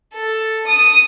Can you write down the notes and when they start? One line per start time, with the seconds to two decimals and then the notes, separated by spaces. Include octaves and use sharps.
0.14 A4
0.66 D#6